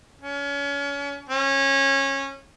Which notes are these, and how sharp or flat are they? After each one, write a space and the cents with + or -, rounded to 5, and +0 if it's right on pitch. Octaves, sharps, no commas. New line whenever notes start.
C#4 +35
C#4 -20